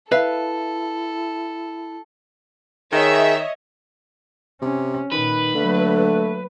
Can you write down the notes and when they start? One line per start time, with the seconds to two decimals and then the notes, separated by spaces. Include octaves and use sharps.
0.12 E4 A4 B4 E5 F5
2.93 D#3 G#4 C#5 D#5 E5
4.62 C3 C#4
5.12 A#2 D#3 B4
5.55 D3 F#3 A3 A#3